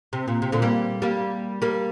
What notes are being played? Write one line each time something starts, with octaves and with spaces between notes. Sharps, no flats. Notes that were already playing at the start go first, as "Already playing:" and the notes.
C3
A#2
C3
A#2 D3
G3 A#3
G3 A#3
G3 A#3